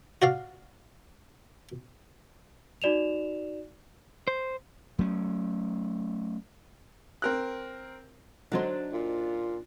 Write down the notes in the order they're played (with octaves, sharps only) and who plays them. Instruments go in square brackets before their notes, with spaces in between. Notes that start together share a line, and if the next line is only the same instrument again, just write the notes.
[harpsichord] F#4 D5 F5
[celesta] D#4 F#4 D5 E7 F7
[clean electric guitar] C5
[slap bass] F#3 A3 C#4
[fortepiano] C4 A#4 F#6
[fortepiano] D3 F#3 [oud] D4 D#4 C5
[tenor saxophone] A#2 [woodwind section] F4